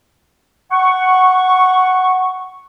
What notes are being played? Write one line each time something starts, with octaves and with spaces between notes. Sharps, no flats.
F#5 C#6